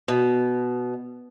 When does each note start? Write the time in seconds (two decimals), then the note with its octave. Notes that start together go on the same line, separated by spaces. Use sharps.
0.08 B2